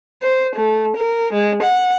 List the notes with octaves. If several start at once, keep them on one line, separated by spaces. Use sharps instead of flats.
C5
A3
A#4
G#3
F#5